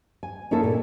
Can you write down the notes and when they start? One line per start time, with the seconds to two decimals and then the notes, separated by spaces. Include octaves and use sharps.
0.23 G#5
0.51 A#3 C#4 D#4 E4 G#4 A4
0.63 A#2